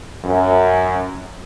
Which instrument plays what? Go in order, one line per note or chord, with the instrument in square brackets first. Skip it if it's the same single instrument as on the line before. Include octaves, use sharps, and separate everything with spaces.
[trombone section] F#2